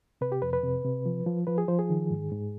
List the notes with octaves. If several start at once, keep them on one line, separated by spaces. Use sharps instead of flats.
C3 B4
G4
F2 B4
B4
C3
C3
F3
F3
F3 B4
G#4
F3 C5
G#4
D#3
G#2
G#2